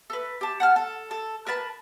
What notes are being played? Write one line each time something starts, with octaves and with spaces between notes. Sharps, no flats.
A4 B4
G4 A5
F#5 A5 F6
A4
A4
A#4 B4 A5 B5